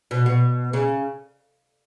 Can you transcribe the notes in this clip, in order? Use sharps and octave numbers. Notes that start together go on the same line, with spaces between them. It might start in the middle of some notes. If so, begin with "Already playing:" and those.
B2
B2
C#3